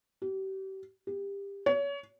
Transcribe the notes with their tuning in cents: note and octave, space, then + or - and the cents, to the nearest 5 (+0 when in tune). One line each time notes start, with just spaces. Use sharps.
G4 -35
G4 +25
C#5 +30